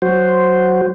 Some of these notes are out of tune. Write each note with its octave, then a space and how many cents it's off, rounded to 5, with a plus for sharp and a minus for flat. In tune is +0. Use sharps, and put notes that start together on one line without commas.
F#3 +0 F#4 +0 C5 -5